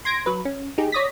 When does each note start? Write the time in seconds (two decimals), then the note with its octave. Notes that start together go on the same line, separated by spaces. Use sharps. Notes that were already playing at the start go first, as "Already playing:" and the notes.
0.05 C6 G#6 A#6 D7
0.26 F#3 B4
0.45 C#4
0.78 D#4 G4 G#4
0.92 C#5 D5 D#6 A#6 B6